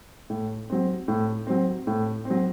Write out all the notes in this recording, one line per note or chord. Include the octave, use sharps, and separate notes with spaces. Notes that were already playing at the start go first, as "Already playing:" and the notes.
A2
F#3 C4
A2
F#3 C4
A2
C4
F#3